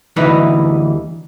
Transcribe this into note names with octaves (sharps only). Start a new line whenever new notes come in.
D2 E3 G3 D#4 B4